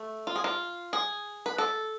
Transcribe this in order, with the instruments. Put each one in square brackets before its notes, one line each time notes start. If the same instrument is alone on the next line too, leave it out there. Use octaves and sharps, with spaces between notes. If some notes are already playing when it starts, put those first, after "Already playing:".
Already playing: [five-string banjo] A3
F4
G#4
F4
G#4
B4
A4